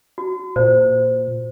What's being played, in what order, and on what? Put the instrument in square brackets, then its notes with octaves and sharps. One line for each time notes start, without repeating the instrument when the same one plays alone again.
[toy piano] F#4
[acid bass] A#2 [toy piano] C5